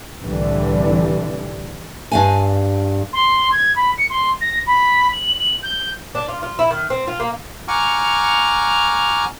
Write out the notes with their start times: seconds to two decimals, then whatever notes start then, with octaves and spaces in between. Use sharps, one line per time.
0.22 C2 A2 D3 E3 G3
2.11 G2 F5 G#5
3.13 C6
3.52 G#6
3.76 B5
3.98 C#7
4.10 C6
4.41 A#6
4.67 B5
5.13 F#7
5.40 F#7
5.63 G6
6.15 D4
6.28 F4
6.43 F4
6.59 E4
6.71 D#3
6.90 C4
7.07 F4
7.20 A#3
7.68 F#5 G#5 A#5 C#6 D6 F6